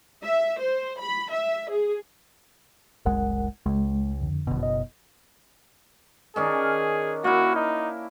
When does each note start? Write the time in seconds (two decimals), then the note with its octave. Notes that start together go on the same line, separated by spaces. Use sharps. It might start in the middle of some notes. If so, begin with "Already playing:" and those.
0.25 E5
0.61 C5
1.01 B5
1.33 E5
1.71 G#4
3.06 F#1 C2 G#3 A#4 F#5
3.66 C#2 G#3
4.21 F2 D3
4.47 F#1 B2
4.63 D#5
6.36 D#3 C#4 D4 G#4
7.24 A#3 E4 F#4
7.56 D#4